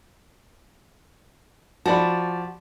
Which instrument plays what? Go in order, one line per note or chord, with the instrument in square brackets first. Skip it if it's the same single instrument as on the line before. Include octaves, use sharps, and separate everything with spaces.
[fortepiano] F3 D5 B5 [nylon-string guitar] F#4 [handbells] A5